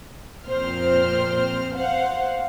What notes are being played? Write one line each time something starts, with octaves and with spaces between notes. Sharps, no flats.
F2 A#2 C4 C5 F6
C5 F5 F#5